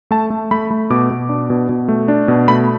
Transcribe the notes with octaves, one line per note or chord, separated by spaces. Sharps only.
A3 A5
A3
A3 B5
A3
B2 D6
B2
D4
B2
B2
A3
D4
B2
A3 B5